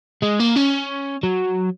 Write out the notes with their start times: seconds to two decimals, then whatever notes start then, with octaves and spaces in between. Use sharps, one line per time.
0.23 G#3
0.40 A#3
0.56 C#4
1.23 F#3